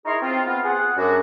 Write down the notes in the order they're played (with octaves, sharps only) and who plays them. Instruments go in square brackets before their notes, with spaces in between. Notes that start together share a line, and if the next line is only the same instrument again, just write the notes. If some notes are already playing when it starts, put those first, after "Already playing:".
[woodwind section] D#4 E4 G#4 A#4 C#5 C6
C4 F4
B3 F4
G#4 F#5
F#2 D4 F#4